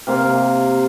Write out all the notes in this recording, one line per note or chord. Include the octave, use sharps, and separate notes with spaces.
C3 A#3 F5